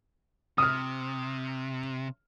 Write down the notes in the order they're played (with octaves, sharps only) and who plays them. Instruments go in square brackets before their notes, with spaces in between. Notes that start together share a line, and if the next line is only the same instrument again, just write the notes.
[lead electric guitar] C3 [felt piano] D#6 F6